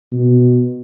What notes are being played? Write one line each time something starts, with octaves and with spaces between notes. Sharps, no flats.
B2